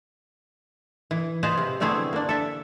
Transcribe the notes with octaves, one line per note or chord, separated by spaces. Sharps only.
E3
F4 G#4 B4 C5 D#5 F5
C3
D3 A3 B3 C4 E4 G#4
A#3 D4
A4 E5